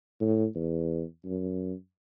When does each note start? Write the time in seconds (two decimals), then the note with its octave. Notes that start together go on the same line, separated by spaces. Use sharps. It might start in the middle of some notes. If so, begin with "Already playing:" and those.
0.21 A2
0.55 E2
1.25 F#2